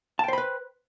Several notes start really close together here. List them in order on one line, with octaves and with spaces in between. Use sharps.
A5 G5 C5 B5 B4